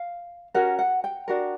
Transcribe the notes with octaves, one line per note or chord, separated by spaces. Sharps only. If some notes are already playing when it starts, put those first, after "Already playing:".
Already playing: F5
C#4 F#4 A#4 F#5
F#5
G5
D4 F#4 A#4